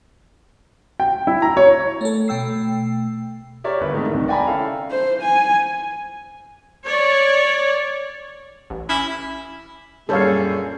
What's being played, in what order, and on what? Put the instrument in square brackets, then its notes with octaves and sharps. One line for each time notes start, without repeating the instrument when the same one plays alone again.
[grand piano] G5
E4
A#5
C#5
[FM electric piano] A3 A4
B2 A3 G5 E6 C7
[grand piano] G4 A#4 C#5 D5 E5
G1 B4
G#2 C3 D#3 A3 E4
C2 C3 D#3
D5 G5 G#5 A#5 B5
C#4 E4 A4 F5
[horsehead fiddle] C5
G#5
[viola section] C#5 D5
[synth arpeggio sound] A1
[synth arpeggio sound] C#4 D6 [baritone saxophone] E4
[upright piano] F#2 G3 [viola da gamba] A#2 G#4 [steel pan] A4 C#5 F5